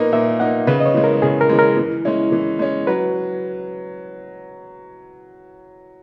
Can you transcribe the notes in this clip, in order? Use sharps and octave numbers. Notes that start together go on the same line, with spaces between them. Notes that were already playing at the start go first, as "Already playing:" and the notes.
Already playing: A#2 A#3 D#4 A#4 B4
A#2 E5
A#3 D#4 F#5
C#3 B4
D#5
C#5
E3 G#3
A#4
C#3 G#4
A#4
E3 G#3
A#4
E3
G#3 C#4 E4
E3
G#3 C#4
F#3 B4